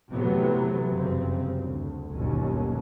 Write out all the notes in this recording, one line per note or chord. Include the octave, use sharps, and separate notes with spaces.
C3 E3 F#3 A3 B3
F1 F#2 C#3 G3 C4
D2
G1 D#2 B2 F#3 C#4